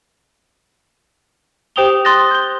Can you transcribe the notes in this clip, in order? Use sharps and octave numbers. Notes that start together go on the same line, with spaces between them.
G4 C5 G5 D#6 F7 G7
C6 D#6 F#6 A6 A#6
G6 G7